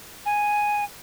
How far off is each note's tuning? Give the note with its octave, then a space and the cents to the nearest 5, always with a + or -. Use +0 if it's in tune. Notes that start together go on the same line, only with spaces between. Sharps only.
G#5 +0